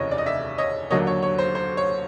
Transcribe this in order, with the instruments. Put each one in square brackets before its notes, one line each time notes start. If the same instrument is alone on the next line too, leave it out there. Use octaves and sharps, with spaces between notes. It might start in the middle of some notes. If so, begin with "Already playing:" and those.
Already playing: [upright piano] F1 D#2 C#3 E3 C#5 D#5
D5
D#5
D5 E5
C#5 D#5
D#2 D3 F#3 A#3 C#5 D#5
C#5
C#5
C5
C5
C#5